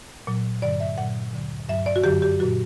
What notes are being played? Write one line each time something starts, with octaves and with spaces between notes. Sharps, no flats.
A#2 F#3
G2 D3 F#3 D5
E5
A#2 F#3 F#5
D2 D3 F#3
G2 F#3 E5
D5
F#4
F#2 D3 F#3 G4
G4
A#2 F#3 F#4